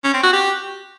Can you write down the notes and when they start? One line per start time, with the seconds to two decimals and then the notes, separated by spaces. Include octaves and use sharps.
0.04 C#4
0.14 C4
0.23 F#4
0.33 G4